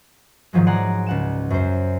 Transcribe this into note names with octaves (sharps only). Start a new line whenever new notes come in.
G#2 D#3 F3 F#3 G#3
D5 F#5 G#5 A#5 C6
C#2 F#5 E7
F#2 C5